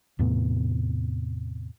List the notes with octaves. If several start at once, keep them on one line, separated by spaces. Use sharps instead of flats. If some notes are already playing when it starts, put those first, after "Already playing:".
E2 A2 C3 B3